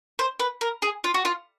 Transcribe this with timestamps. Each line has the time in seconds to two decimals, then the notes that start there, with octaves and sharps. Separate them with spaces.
0.19 C5
0.40 B4
0.61 A#4
0.82 G#4
1.04 F4
1.14 F#4
1.25 F4